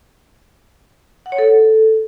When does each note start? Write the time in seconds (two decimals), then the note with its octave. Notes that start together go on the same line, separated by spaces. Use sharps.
1.26 F#5
1.32 C#5
1.38 A4